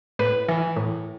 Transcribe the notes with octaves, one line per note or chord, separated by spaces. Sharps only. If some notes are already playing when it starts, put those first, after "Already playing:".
A2 B4
E3
A2